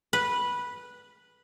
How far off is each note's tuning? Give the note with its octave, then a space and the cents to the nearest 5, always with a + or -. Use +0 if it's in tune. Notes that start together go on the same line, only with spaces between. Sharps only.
B4 -10